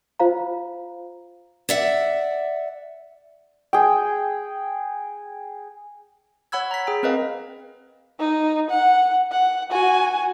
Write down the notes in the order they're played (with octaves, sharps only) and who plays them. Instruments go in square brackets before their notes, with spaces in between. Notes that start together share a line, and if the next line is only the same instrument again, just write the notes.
[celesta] F4 C5 F5 A#5
[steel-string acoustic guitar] D5 E5 F#5
[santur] G#4 G5
[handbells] C#5 F#5 B5 E6 G#6
A#5 B6
G#4 G5
C4 A#4 B4 D#5 F5
[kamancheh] D#4
F#5
F#5
F#4 G#5